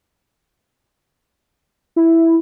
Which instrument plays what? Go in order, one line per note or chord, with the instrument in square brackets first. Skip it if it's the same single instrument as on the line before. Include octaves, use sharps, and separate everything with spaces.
[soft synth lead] E4